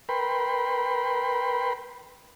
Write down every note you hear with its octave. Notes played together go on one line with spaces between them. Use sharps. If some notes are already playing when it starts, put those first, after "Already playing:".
A#4 B4 G5 B5 C6